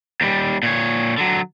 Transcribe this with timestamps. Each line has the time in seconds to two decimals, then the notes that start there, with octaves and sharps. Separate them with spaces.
0.21 D#2 G3
0.63 A#2 C#5
1.18 D3 F#3